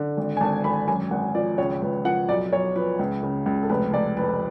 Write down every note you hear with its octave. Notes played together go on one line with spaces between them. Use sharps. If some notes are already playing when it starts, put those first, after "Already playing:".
Already playing: D3
G#1
G#5
G#1 A5
G#1 B5
F#2 G#5
G#1 F#5
F3 D5
C#2 C#5
C#2 B4
F3 F#5
B1 D5
B1 C#5
F3 B4
C#2
C#3
C#2
A4
F1 B4
F1 D5
F2 B4